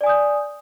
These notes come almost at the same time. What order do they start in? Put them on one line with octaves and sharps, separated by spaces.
D5 G#5 D#6 G6